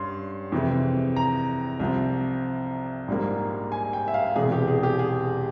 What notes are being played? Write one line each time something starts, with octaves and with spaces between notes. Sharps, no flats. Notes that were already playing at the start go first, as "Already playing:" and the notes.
Already playing: G2 G3 C#4 C6
F2 C3 E3 G#3
A#5
C2 C3 F3 C4
A#1 G#2 G3 A#3
G#5
G5
E5
F5
E1 E2 C3 E3 G#4
G4
G#4
G4
G#4